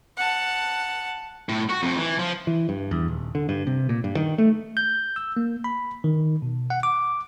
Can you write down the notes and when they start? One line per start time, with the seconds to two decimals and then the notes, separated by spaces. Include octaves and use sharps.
0.17 F#5 A5
1.49 A2
1.69 F#4
1.83 F2
1.98 E3
2.19 F3
2.47 E3
2.69 G2
2.91 E2
3.08 D#1
3.35 D3
3.49 G2
3.67 C3
3.89 A#2
4.04 G2
4.17 D#3
4.38 A3
4.77 G6
5.16 E6
5.37 A#3
5.64 B5
6.04 D#3
6.42 B2
6.70 F#5
6.83 D6